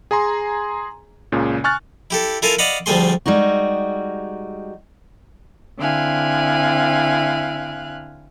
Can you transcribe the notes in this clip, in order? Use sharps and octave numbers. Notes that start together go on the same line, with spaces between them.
G#4 G#5 A#5 C6
C#2 A#2 C#3
G#5 C#6 F6 F#6 A6
E4 G4 A4
E4 F4 A4 A#4 F5 G#5
D5 D#5 F5 F#5 B5
D2 F3 G3 A3 G#4 C6
G3 G#3 D#4 F#4
D3 C4 E4 F5 G#5 F#6